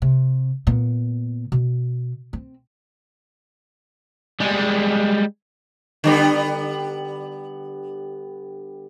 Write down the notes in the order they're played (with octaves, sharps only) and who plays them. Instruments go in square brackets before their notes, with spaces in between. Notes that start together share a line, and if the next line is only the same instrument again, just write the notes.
[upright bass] C3
A#2 B3
B2
C4
[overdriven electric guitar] G3 G#3
[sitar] D3 G3 B3